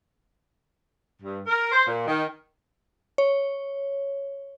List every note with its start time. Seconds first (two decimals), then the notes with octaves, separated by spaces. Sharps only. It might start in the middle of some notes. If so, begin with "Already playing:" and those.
1.22 G2
1.46 A#4
1.72 C5
1.87 A#2
2.07 D#3
3.18 C#5